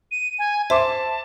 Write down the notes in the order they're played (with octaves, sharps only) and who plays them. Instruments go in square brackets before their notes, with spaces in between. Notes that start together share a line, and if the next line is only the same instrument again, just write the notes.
[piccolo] D#7
G#5
[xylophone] C5 [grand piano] E5 C6 D6 [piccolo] A5